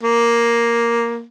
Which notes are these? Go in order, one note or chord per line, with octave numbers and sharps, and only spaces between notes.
A#3